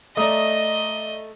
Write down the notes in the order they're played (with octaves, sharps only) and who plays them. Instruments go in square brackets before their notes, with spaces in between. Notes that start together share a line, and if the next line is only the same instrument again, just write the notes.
[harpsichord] A3 [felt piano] D5 A#5 D#6 [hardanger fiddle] D#5